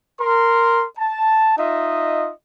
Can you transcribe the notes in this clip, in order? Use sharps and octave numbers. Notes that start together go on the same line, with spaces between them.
A#4 C6
A5
D#4 F4 D#5 E5